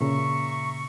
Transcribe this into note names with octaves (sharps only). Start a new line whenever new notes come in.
A#2 C#3 E5 A#5 C#6